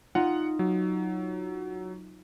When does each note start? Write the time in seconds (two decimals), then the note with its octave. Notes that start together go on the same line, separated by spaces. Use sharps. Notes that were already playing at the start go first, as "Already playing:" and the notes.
0.15 D#4 F4 F5 F#5
0.59 F#3